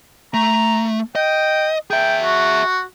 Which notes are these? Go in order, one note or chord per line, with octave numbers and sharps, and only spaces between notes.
A3 A#5
D#5 G5
G#4 E5 G5
F#4